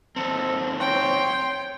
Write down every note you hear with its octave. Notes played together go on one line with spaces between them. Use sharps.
D#2 C4 A4
C#5 G5 C6